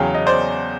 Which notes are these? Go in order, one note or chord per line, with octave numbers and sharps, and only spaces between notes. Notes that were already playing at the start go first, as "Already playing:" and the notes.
Already playing: E2 C#3 F#3 F5 G5
D#5
C5 D5